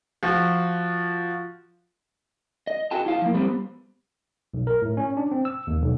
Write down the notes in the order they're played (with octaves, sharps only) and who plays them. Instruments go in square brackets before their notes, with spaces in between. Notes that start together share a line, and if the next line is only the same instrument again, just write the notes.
[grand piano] F3 F#4
[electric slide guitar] D#5
F#4 G#4 G5 A5
E4 F5 A5
F3 A#3
G3 B3 C4
[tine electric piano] B1
A#4
A2
C#4
D4
C4
E6
D#2
B1